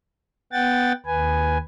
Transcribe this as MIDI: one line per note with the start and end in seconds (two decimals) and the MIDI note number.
0.52 0.92 59
0.52 0.92 78
0.52 0.92 79
0.52 0.92 93
1.06 1.58 39
1.06 1.58 71
1.06 1.58 80